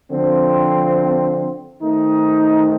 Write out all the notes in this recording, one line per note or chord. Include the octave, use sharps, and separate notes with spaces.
D3 F3 C4
D#3 A3 C4 D#4